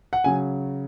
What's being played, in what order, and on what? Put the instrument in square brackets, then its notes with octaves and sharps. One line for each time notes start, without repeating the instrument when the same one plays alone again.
[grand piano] F#5
C#3 F#3 G#5